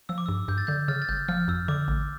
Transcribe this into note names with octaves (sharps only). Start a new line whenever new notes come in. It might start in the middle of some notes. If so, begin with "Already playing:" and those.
F3 E6
D6
G2 E6
G2 G6
A6
D3 G6
C#3 F6 A6
A6
G1 G6
F3 F6
F2 E6
D3 D6
A1